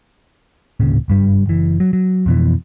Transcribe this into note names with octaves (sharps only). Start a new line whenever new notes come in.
D1 G#1 A#2 C#3
F#1 G2 G3
F#1 E3
F#3
F#3
F2 B2 E3